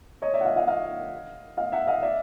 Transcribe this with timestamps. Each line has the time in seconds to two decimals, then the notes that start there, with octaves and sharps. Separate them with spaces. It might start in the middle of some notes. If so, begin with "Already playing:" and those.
0.22 C#5 D#5
0.34 D5 E5
0.41 F#5
0.45 D#5 F5
0.56 D#5 F5
0.68 D#5 F5
1.57 D#5 F5
1.72 E5 F#5
1.87 D#5 F5
2.03 D5 E5